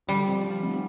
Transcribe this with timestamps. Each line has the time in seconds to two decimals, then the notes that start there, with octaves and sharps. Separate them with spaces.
0.08 D3 G3
0.27 F3 C4
0.45 F3
0.63 A3 C4